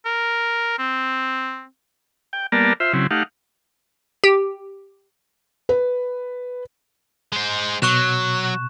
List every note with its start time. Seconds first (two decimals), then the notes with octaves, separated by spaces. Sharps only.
0.05 A#4
0.79 C4
2.33 G5
2.52 G3 A#3 B3 A#4 D5 A5
2.80 F4 C5 E5
2.93 C#3 F#3 C4 E4
3.11 A3 D#4 G4 F5 F#5
4.24 G4
5.69 B4
7.32 G#3 C5
7.82 B2 F#3 C#6 F#6 E7